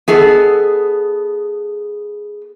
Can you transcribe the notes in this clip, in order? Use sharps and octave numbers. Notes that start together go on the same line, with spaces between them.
B3 G#4 A4 D#5